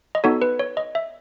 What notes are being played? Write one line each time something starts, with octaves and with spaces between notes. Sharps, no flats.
D#5
B3 D#4 F#4 A4 C#5
B4
C#5
D#5
E5